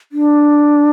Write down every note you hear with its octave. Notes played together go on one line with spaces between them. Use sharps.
D4